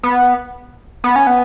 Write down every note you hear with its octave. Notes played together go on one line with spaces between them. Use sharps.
B3
B3
C#4
B3